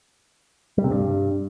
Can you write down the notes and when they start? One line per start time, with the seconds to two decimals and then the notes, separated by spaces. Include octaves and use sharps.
0.78 G3
0.84 C3
0.91 G2